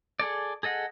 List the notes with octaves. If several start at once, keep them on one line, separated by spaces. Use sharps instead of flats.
G#4 A4 D5
G#4 A4 D#5 F#5